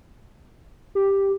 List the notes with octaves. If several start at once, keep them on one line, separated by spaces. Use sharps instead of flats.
G4